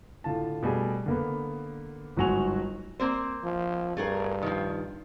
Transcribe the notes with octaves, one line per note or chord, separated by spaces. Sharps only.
A2 D3 F4 A5
B2 G3 A3 G#4
D3 A#3 B3
G1 G#2 F#3 F#4 G#5 F7
A#3 C4 C5
F3
G2 A3 G#4 A#4
D#3 F3